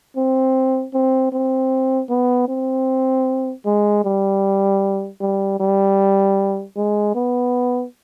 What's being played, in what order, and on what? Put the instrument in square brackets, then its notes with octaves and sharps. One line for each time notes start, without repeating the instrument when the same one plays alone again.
[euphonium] C4
C4
C4
B3
C4
G#3
G3
G3
G3
G#3
B3